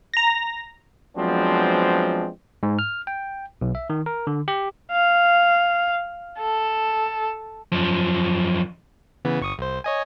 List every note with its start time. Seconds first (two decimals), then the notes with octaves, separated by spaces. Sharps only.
0.14 A#5 A#6
1.17 F3 F#3 G#3 B3 C4 D4
2.63 G#2
2.79 F6
3.07 G5
3.61 B1
3.75 E5
3.90 D#3
4.06 A#4
4.27 D3
4.48 G4
4.92 F5
6.39 A4
7.72 F#2 F3
9.25 C#3 E3 B3
9.40 G1 C#6 D#6
9.58 C2 C5
9.84 C#5 D#5 G#5